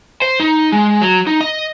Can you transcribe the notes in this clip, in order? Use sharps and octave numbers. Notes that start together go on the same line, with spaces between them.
C5
D#4
G#3
F#3
D#4
D#5